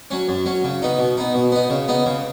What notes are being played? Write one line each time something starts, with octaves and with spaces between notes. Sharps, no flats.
F#3 C#4
F#2
F#3 C#4
C#3
B3 D#4
B2
B3 D#4
B2
B3 D#4
C#3
B3 D#4
C#3